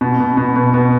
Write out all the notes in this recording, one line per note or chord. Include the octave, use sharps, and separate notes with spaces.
B2
B2
B2
B2
B2